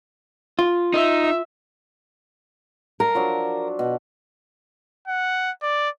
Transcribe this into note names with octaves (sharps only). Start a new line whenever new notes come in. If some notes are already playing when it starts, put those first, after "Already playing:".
F4
D#4 E5
A#4 F5 A5
F3 F#3 D4
B2
F#5
D5